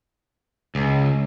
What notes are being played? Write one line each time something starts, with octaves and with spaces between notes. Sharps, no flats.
C#2